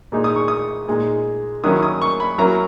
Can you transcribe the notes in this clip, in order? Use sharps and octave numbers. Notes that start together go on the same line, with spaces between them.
A#2 G#3 D#4
D#6
C#6
D#6
A#2 G#3 D#4
D#3 F#3 A#3 C#4 E4 D#6
D#6
C#6
B5
F#3 A#3 C#4 E4 A#5